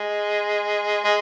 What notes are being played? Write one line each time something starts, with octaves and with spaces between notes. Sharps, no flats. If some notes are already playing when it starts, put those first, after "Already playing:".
Already playing: G#3
G#3